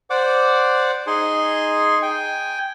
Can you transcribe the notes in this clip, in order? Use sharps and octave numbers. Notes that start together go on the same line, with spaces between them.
C5 D5 F#5 D6
D#4 G#4 G#5 C6
G5 G#5